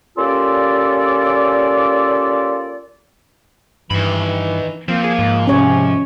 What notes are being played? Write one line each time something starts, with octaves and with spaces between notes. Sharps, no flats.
A#3 C#4 F4 G4 A4 D5
G2 D#3 E3 B5
F3 A#3 C4
G#4
G#2
C3 C#4 C#5